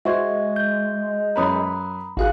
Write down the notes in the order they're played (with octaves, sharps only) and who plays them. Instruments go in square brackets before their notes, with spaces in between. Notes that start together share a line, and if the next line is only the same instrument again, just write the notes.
[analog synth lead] G#3 [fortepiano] F#4 C5 [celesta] E5 C#6 G#6
[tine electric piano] G6
[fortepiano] F#2 C#4 B4 [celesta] A#5 B5 D#6
[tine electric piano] G#1 F5 [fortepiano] F#4 G#4 F#6